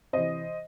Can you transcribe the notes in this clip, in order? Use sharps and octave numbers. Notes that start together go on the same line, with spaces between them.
C3 E3 C5 D#5